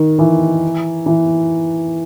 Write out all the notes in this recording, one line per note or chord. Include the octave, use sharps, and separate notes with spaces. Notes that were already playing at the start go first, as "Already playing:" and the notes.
Already playing: D#3
E3
E3